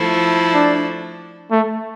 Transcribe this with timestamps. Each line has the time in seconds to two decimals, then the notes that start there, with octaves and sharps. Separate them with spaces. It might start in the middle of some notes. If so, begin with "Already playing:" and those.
Already playing: F3 A3 E4 A4
0.54 D4
1.51 A3